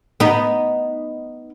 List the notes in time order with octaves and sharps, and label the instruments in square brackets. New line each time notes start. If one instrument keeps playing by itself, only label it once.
[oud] B3 D#4